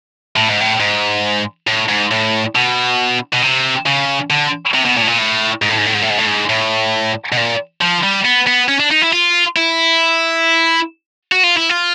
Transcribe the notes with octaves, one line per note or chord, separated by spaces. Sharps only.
A2
G#2
A2
G#2
A2
G#2
A2
B2
B2
C3
C#3
D3
C3
B2
A#2
A2
A#2
A2
G#2
A2
G#2
A2
G#2
A2
G#2
A2
G#2
A2
B2
A#2
F3
G3
B3
B3
C#4
D4
D#4
E4
F4
E4
F#4
F4
E4
F4